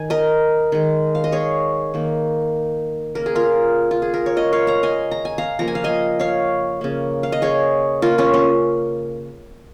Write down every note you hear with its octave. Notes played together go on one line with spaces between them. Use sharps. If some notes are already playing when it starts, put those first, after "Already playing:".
Already playing: D#3 G#5
A#4 D#5
D#3 G#3
F5
D#5
G#4 C#5
D#3 A#3
C#3 A#3 A#4
G#4
F4 A#4
F4
G#4
A#4
C#5
C#3 G#3 A#4 D#5
C#5 F5
F5 A#5
D#5 G#5
A#5
G#5
F5 A#5
C#3 F3 A#3 A#5
G#5
F5
D#5 G#5
C#5 F5
C#3 A#3
F5
D#5
G#4 C#5
C#3 A#3 F4 A#4
C#4 F4
C#4